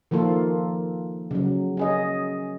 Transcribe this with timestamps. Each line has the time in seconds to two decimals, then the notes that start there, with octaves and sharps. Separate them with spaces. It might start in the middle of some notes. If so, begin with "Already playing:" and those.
0.11 D#3 F3 A#3 F4 A4
1.31 C#3 F#3
1.77 C#4 G#4 D#5